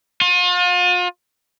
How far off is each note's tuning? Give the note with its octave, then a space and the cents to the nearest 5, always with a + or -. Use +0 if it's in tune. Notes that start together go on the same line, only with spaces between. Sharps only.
F4 +40